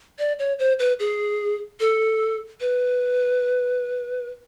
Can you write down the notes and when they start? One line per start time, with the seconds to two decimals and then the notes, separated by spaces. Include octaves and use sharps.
0.19 D5
0.39 C#5
0.59 C5
0.79 B4
1.00 G#4
1.80 A4
2.61 B4